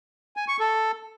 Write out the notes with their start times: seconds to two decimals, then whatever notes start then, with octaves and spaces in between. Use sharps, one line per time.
0.37 G#5
0.48 C#6
0.60 A4